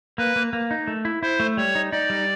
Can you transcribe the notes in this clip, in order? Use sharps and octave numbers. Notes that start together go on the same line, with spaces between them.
A#3 B4
A#3
A#3
D#4
A3
E4
E4 C5
A3
G3 C#5
D#4
D#4 D5
G3